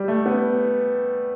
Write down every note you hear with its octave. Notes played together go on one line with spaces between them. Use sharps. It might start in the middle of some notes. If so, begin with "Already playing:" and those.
Already playing: G3
A3
B3